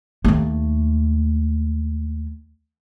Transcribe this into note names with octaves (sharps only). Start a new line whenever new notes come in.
D#2 A3